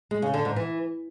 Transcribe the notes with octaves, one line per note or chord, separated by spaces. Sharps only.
G#3
C#3
D3
G#2
E3